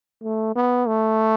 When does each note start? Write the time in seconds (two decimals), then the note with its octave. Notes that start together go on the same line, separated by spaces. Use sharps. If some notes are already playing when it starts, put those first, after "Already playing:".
0.23 A3
0.56 B3
0.88 A3